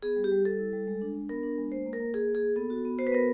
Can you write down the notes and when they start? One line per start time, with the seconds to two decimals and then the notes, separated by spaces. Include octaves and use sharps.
0.03 B3 G#4
0.16 G3
0.24 G4
0.32 G3
0.45 G3 A4
0.59 E4
0.73 G3
0.87 G#3
1.01 D4
1.15 D4
1.29 B3 A#4
1.43 D4
1.58 G#3
1.72 A#3 C5
1.86 A#3
1.93 A#4
2.00 A#3
2.14 A#3 G#4
2.28 A#3
2.35 G#4
2.42 A#3
2.56 B3 A4
2.70 F#4
2.85 B3
2.98 F#4 C5
3.07 B4
3.12 B3 A#4